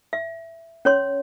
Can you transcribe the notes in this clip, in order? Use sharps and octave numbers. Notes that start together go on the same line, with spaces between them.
E5
C#4 C#5 C6